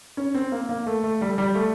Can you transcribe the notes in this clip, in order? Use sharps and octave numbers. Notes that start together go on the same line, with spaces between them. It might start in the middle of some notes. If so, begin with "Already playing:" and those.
C#4
C4
A#3
A#3
A3
A3
G3
G3
A3